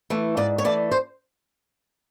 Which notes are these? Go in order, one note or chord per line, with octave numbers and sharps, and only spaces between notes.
E3 A3
G#2 D5
C#5
E3 A3 D5
C5